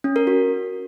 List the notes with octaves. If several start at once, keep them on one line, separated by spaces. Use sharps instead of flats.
C#4
A#4
F#4